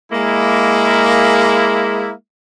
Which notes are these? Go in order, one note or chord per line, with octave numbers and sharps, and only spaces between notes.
G#3 A#3 E4